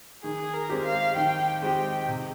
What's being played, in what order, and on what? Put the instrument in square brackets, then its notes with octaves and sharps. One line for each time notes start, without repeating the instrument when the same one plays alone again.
[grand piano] D#3 [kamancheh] G#4
[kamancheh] A#4
[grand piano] G#3 C4 G4
[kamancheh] F5
[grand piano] D#3 [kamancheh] G5
[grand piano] G#3 C4 G4 [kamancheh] G5
[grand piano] C3